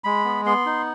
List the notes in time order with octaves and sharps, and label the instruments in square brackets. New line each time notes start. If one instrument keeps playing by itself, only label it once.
[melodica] G#3 B5
B3
B3 C6
D#4